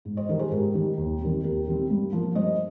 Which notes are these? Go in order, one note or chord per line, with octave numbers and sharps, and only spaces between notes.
G#2
C5 D#5
D#3 G3 A#4
G#4 C5
G#2 G4 A#4
D#3 G3
D#2
D#3 G3 C4
D#2 G4 A#4
D#3 G3 C4
G2
F3 A#3
G2 C5 D#5